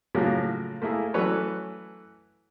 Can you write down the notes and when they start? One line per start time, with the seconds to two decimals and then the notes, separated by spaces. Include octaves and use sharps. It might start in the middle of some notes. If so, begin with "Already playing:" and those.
0.15 A2 C#3 F3 F#3 A#3
0.82 A3 A#3 E4 G#4
1.14 E3 F#3 A3 C#4 B4 C#5